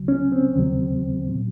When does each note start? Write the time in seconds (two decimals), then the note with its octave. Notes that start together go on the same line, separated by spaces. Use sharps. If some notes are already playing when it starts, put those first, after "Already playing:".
Already playing: C#2 C#3 F#3
0.08 C#4
0.32 C4
0.56 D#2 C#3 F#3
1.28 A#2 F#3